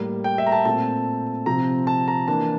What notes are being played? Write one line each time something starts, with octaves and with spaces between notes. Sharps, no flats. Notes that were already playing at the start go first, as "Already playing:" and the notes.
Already playing: A2 G3 A#3
G5
E5
A#5
A5
A#2 A3 C4 A5
C3 F3 C4 A#5
A5
A#5
E3 A#3 D4 A5